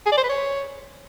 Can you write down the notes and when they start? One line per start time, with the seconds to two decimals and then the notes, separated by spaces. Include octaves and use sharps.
0.06 G#4
0.12 D5
0.18 C5
0.24 B4
0.29 C#5